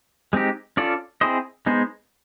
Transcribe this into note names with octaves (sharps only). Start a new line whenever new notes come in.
G#3 C4 D#4 G4
C#4 F4 A4 D5
C4 E4 G#4 C5 D#5
G#3 B3 D#4 G#4 C5